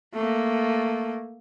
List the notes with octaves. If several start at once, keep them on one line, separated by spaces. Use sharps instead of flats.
A3 A#3